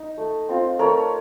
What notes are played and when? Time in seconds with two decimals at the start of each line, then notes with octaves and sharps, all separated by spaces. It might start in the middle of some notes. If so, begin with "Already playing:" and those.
Already playing: D#4
0.17 A3
0.49 C4 F4
0.79 A3 A#4 C#5